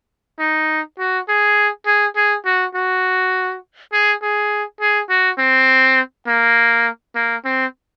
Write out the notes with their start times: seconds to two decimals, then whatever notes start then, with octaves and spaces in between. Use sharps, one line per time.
0.39 D#4
0.98 F#4
1.28 G#4
1.86 G#4
2.16 G#4
2.45 F#4
2.75 F#4
3.93 G#4
4.22 G#4
4.81 G#4
5.10 F#4
5.38 C4
6.27 A#3
7.15 A#3
7.45 C4